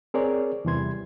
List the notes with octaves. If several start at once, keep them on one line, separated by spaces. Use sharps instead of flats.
C4 G#4 A#4 C#5 D5
E2 C3 E3 G3 C6 G#6